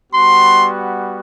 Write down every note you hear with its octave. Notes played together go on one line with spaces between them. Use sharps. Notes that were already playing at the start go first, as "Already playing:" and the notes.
G3 B3 F#4 C6